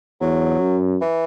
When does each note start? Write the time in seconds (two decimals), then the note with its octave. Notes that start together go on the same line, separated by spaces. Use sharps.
0.21 E2 F#3
0.61 F#2
1.01 E3